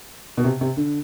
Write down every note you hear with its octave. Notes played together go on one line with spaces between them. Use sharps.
B2
C3
C3
D3